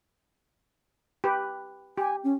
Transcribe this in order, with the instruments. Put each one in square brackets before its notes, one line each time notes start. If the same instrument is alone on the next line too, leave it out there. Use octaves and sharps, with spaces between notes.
[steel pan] G4 B4
[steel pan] G4 [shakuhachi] G#5
[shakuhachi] C#4